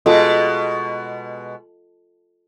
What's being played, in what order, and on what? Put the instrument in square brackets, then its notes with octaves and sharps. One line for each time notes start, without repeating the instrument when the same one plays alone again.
[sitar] B2 G#3 [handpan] F4 A4 D#5